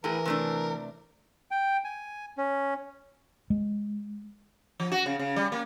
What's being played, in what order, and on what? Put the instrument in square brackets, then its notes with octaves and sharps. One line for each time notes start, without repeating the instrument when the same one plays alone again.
[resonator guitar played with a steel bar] A2 G#4 [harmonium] E3 [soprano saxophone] A#4
[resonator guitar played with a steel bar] C3 A3 D4
[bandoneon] G5
G#5
C#4
[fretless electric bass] G#3
[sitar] F3
F#4
C#3
C#3
G3
A#3